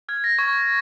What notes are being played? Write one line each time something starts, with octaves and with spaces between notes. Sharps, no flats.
F6 G#6
A#6
C#6 G#6